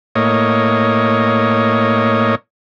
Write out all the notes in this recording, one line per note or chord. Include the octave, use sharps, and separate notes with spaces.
A2 A#3 C#5 D#5